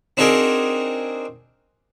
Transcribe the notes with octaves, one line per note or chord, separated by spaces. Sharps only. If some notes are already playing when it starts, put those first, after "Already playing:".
C4 D4 D#4 F#4 G#4 A#4